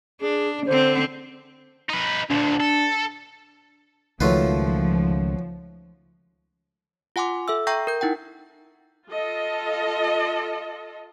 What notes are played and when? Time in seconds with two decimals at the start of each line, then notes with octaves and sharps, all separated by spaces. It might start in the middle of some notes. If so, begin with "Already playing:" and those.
0.22 D4 G#4
0.67 D3 C4 C5
1.89 D#4 B4
2.30 D2 A#2 D4
2.60 A4
4.21 C#2 D#3 F3 F#3 A3 F4 B4
7.16 F4 F#5 G#5 C6 D6
7.48 A4 E5 E6
7.67 E5 G5 A#5 C#6 G6 A#6
7.87 A#4 G6
8.01 D#4 E4 F#5 G5
9.08 F4 A4 D#5